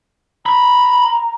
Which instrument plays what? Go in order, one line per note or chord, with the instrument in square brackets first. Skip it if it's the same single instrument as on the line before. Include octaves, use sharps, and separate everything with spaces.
[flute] A#5 [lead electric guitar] B5